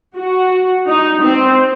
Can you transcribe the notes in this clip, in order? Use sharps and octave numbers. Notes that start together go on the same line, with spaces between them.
F#4
D#4
C4